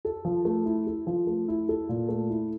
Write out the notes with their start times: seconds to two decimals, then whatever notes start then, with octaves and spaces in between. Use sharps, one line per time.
0.05 A4
0.25 F3
0.45 A3
0.66 E4
0.87 A4
1.07 F3
1.27 A3
1.48 E4
1.69 A4
1.89 A#2
2.09 A3
2.30 E4